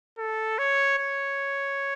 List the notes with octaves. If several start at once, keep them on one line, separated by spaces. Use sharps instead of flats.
A4
C#5
C#5